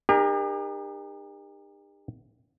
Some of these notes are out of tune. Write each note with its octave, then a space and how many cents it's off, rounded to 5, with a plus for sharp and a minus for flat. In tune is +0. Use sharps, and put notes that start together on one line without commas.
D#4 -40 G4 +40 A#4 +20